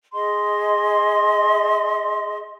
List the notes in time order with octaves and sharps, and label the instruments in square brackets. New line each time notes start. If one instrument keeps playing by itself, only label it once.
[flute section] G#4 D#5 C6